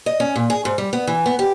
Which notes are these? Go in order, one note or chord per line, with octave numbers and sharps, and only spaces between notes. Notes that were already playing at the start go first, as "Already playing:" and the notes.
D#5
C#4
A#2
G#4
G#2
G3
B3
E3
B3
G4